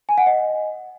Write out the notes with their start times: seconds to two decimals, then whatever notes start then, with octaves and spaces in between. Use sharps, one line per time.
0.09 G#5
0.18 F#5
0.27 D#5